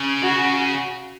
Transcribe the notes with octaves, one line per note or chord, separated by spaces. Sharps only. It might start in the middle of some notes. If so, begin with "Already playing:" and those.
Already playing: C#3
F#4